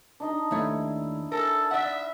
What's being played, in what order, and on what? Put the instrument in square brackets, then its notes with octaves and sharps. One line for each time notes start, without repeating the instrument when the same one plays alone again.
[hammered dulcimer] D4 D#4 D#5
[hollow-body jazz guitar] D#2 A3 C#5 [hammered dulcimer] E4
[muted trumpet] A4 [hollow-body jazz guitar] A#4
[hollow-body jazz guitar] D5 F#5 [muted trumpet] E5